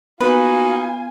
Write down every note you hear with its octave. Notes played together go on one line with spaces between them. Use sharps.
A#3 B3 D#4 F4 F#4 B4 G#5